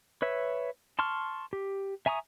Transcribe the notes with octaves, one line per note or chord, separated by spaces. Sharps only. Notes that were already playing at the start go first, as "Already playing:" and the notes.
B4 C#5 E5
A5 C6 C#6 F6
G4
E5 G#5 A#5 C#6 D#6